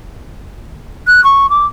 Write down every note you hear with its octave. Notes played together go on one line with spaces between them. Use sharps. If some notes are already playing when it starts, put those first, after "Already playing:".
F#6
C#6
D6